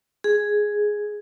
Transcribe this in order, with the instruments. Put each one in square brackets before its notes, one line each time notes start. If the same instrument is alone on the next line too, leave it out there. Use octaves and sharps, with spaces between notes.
[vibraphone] G#4